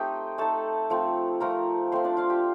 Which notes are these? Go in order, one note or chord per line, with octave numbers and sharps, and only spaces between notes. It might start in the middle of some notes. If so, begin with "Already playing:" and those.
Already playing: A3 C4 D#4 G4 C5 D#5 G5
A3 D#4 A4 A5
F3 A3 C4
F3 A3 C4 A#4 A#5
F3 A3 C4 C5 C6
D4 D5
F4 F5
G4 G5